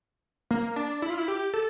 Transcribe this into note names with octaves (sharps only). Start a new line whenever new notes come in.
A#3
D4
E4
F4
E4
G4
A4